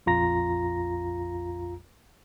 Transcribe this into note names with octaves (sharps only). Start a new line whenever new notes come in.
A#1 F2 F4 A#5 A#6